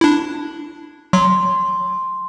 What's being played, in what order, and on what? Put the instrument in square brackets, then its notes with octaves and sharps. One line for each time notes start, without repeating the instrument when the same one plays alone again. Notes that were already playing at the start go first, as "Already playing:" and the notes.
[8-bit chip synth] D4 E4
[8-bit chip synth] F#3 [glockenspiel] C6